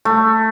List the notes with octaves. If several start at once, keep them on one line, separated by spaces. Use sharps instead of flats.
A3